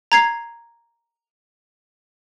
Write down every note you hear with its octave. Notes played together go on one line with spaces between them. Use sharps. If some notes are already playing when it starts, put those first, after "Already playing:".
A#5 G#6 C7